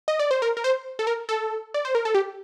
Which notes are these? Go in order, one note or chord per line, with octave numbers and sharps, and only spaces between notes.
D#5
D5
C5
A#4
A#4
C5
A4
A#4
A4
D5
C5
A#4
A4
G4